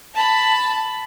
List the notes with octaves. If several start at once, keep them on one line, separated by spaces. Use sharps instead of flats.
A5 B5